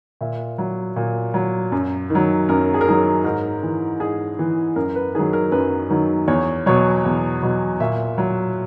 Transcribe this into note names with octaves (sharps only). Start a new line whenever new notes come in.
A#2 E5
F#3
A#2
F#3
F#2
D#3
F#3
F#2 A#4
G#4
A#4
D#3 F#3 G#4
G#2 A#4
E3
G#2 G#4
E3
F#2 A#4
B4
D#3 F#3 G#4
A#4
F#2 B4
D#3 F#3
E2 C#5
B2 F#3 C#5
E2
B2 F#3
A#2 E5
F#3